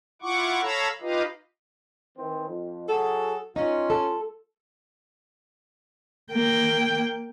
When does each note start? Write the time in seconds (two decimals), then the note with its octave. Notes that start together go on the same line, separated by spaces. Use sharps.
0.22 E4 F4 F#5 C#6 D6
0.61 A4 C#5 F5 A#5 B5 E6
1.01 D#4 F4 G4 B4 D#5 F5
2.16 D#3 E3 C4
2.48 F2
2.88 F#3 F#4 G#4 A4
3.56 G3 C#4 D#4 F4
3.90 A4
6.32 A#3 G5